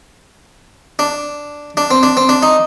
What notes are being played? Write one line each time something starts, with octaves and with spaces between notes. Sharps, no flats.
D4
D4
C4
D4
C4
D4
D#4